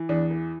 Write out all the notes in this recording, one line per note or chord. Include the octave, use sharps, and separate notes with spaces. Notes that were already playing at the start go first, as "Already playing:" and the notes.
Already playing: E3
E2 D4
E3